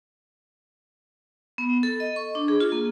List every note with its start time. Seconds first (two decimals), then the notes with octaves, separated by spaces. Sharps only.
1.58 B3
1.83 A4
2.00 D#5
2.16 C#6
2.35 D4
2.48 G#4
2.60 F4
2.72 A#3